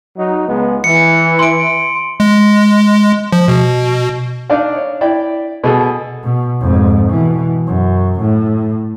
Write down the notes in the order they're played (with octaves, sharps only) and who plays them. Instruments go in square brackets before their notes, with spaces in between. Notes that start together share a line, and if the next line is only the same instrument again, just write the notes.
[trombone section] F#3 D#4
C#2 G#3 B3
[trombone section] E3 [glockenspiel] C#7
[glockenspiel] C6 D7
[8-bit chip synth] G#3
F3
B2
[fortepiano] D4 D#4 D5 D#5 F5
C#5
E4 D5 G5
B2 G#4 A4
[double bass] B2
F2 G#2
B2 E3
F#2
A2